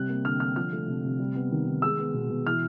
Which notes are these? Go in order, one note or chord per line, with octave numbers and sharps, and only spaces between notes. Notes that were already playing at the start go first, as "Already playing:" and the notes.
Already playing: C3 G3 F#6
A#3
D3 F6
D3 F6
F3 F6
A3
C3
C3
G3
B3
D#3
D#3
G#3 E6
B3
B2
B2
E3 F6